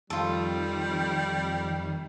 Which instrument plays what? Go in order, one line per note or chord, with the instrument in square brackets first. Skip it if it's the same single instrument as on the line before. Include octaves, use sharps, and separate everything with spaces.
[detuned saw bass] F2 [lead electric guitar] D#3 [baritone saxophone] G3 [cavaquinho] F4 A4